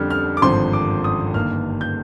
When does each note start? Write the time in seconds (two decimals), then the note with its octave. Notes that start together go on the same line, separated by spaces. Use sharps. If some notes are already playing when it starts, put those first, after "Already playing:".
Already playing: F2 D3 G3 D4 F6
0.10 F6
0.37 D6
0.42 G#1 G2 D3 F3 C4 C6
0.73 D6
1.04 D#6
1.34 G1 G2 D#3 A#3 F6
1.81 G6